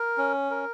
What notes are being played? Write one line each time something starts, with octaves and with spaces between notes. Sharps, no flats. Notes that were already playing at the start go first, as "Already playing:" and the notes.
Already playing: A#4
C#4
A#4